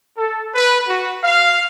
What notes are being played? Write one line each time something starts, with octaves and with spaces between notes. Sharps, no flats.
A4
B4
F#4
F5